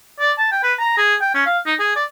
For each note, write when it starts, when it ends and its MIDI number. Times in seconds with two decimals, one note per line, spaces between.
0.20 0.32 74
0.38 0.47 81
0.52 0.60 79
0.63 0.74 71
0.79 0.97 82
0.98 1.15 68
1.21 1.32 79
1.35 1.42 61
1.46 1.58 77
1.66 1.74 63
1.79 1.91 68
1.96 2.04 74